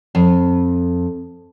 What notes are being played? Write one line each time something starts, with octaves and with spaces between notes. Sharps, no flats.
F2